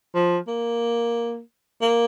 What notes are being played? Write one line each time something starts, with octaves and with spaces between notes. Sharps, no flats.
F3
A#3
A#3